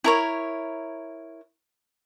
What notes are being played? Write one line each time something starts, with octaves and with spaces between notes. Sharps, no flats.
E4 A#4 C#5